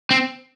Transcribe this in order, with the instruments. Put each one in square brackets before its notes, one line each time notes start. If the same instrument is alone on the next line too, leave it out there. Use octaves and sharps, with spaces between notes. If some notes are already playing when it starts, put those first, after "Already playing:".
[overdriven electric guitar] C4